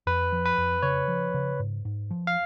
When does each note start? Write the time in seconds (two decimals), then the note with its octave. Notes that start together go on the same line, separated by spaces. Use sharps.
0.07 F2 B4
0.32 F3
0.46 B4
0.58 F2
0.83 C#3 C#5
1.08 F3
1.34 C#3
1.59 G#2
1.85 G#2
2.11 F3
2.27 F5